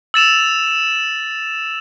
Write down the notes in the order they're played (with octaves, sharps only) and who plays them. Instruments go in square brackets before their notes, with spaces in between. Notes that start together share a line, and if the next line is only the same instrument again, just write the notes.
[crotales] E6 A6 E7 F7